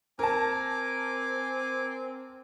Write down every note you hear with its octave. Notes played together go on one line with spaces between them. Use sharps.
C4 A#4 G#5 A5 D6